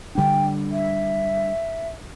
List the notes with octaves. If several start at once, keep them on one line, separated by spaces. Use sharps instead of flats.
D3 G3 D4 G5
E5